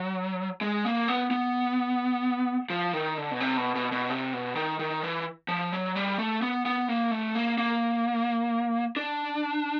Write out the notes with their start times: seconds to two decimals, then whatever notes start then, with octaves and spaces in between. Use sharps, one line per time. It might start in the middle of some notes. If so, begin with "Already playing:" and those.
Already playing: F#3
0.61 G#3
0.85 A#3
1.08 B3
1.31 B3
2.70 F3
2.93 D#3
3.17 D3
3.31 B2
3.40 C3
3.57 B2
3.75 B2
3.92 B2
4.10 C3
4.33 B2
4.55 D#3
4.79 D#3
5.03 E3
5.48 F3
5.73 F#3
5.96 G3
6.18 A3
6.42 B3
6.66 B3
6.88 A#3
7.11 A3
7.35 A#3
7.58 A#3
8.96 D4